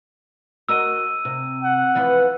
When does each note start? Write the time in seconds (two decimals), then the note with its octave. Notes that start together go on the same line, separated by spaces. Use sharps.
0.69 F#4 A#4 D#5 E6 D#7
1.25 C3
1.63 F#5
1.95 E3 F3 B3